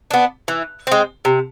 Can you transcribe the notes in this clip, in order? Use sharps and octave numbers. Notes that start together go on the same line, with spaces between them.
B3 D4
E3
G#3 C4
C3